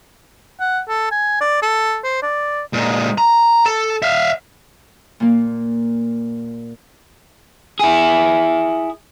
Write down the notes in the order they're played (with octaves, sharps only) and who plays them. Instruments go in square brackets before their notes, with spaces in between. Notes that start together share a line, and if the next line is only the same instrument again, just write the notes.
[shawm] F#5
A4
G#5
D5
A4
C5
D5
[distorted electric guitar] A#2 G#3
A#5
A4
E5 F5
[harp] A#2 A#3
[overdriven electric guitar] E4 G#4